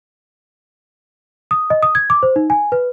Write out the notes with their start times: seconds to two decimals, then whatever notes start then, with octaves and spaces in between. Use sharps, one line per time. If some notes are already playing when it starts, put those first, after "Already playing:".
1.51 D#6
1.70 D#5
1.83 D#6
1.95 G#6
2.10 D6
2.23 C5
2.36 D#4
2.50 G#5
2.72 B4